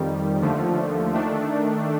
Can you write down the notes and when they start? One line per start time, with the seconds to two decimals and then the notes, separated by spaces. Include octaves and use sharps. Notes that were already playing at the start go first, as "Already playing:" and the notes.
Already playing: F2 D#3 G3
0.40 D#2 D3 F3 A3
1.14 D#3 A3 D4